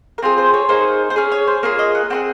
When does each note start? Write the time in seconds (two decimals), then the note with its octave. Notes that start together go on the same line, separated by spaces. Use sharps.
0.18 A#4
0.22 C4 F4 G#4 C5
0.38 C5
0.54 C#5
0.69 A#3 D#4 G#4 C5
1.10 C5
1.16 C#4 G#4 C#5
1.32 C#5
1.47 C5
1.63 A#3 F4 G#4 C#5
1.79 D#5
1.95 F#5
2.10 C4 F4 G#4 F#5